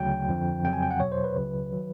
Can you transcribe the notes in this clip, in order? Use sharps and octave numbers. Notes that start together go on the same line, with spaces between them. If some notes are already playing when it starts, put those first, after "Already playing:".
Already playing: D2 C#3 F#3 G5
F2 D3 F3
F2 C#3 F#3 G5
G#5
G5
F#5
E2 B2 F#3 C#5
C5
B4
C#2 C#3 F#3
D#3 F#3